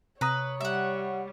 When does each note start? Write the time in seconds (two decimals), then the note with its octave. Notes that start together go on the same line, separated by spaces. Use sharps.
0.21 C3 B4 C#5 A#5 D#6
0.61 G3 E5 F#5